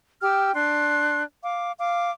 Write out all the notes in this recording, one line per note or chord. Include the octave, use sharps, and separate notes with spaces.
G4 G5 E6 F6
D4 C6 F#6
F5 D6
F5 D6